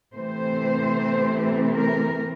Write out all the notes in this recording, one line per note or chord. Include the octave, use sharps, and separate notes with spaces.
C3 E3 A3 C4 C5
A#4